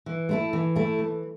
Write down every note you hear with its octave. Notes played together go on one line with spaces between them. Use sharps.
E3
A3 E4 A4
E3
A3 E4 A4
E3